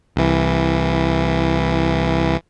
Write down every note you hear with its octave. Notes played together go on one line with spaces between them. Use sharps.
C2 E3